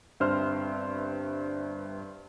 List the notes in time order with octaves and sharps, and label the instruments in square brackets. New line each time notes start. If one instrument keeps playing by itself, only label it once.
[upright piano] G1 G2 C4 C5 F6